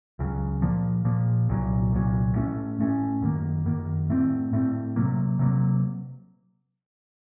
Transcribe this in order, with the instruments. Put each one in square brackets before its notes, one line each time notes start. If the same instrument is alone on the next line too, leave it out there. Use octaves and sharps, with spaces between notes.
[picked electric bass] C#2 C#3 F#3
A#2 F3 A#3
A#2 F3 A#3
C2 A#2 F#3
C2 A#2 F#3
A2 A3 C#4
A2 A3 C#4
F#2 D#3 A#3
F#2 D#3 A#3
A2 A3 C4
A2 A3 C4
C3 F#3 A#3
C3 F#3 A#3